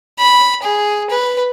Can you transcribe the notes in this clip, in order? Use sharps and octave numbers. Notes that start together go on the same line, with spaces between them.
B5
G#4
B4